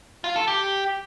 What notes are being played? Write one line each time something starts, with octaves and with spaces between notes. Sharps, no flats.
F4
A4
G4